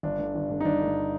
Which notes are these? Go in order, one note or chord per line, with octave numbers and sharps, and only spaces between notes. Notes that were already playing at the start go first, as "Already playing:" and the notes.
G1 D4
G2 D3
G1
G2 D3
D#4
G1 D4
G2 D3